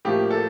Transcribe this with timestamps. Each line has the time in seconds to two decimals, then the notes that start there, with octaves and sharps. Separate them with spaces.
0.05 A2 F3 A#3 G4
0.30 A4